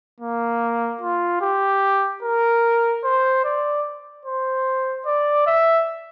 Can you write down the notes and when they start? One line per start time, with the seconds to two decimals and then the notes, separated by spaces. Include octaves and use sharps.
0.21 A#3
1.01 F4
1.41 G4
2.23 A#4
3.04 C5
3.45 D5
4.25 C5
5.06 D5
5.47 E5